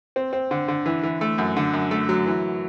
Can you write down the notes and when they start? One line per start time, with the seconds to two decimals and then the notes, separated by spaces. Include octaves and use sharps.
0.16 C4
0.33 C4
0.51 D3
0.68 D3
0.86 E3
1.03 E3
1.21 A3
1.38 F#2
1.56 D3
1.74 F#2
1.91 A3
2.09 F#3
2.27 E3